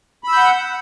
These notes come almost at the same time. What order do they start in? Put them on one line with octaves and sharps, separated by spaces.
B5 E6 G6 F#5